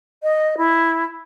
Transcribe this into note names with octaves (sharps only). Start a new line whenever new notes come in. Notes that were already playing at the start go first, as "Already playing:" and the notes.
D#5
E4